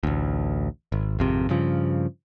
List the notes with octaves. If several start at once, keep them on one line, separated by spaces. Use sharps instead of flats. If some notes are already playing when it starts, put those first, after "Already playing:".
A1 D2
G#1
G#1 F2 C3
G2 C#3 F3